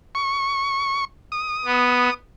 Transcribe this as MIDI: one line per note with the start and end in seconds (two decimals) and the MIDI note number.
0.15 1.05 85
1.32 2.14 87
1.65 2.10 59